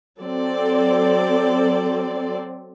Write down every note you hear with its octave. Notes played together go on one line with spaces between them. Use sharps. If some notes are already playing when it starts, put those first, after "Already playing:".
F#3 C4 A4 D5